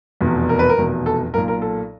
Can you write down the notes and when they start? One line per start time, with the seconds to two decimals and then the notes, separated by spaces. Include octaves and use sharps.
0.21 F1 E2 B2
0.49 A#4
0.59 B4
0.69 A#4
0.77 F1 E2 B2
1.06 A4
1.34 B1 A#2 A#4
1.48 A#4
1.62 A4